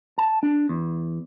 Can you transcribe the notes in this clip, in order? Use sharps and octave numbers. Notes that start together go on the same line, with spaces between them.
A5
D4
E2